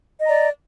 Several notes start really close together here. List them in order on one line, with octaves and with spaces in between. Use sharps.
D#5 A#5 D5